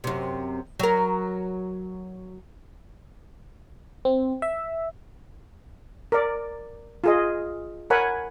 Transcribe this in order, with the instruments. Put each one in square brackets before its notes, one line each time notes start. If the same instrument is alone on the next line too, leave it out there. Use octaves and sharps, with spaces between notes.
[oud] F#2 C3
F#3 A#4
[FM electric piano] C4
E5
[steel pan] A#4 D5
F4 G#4 D#5
A#4 C#5 F#5 G#5 B5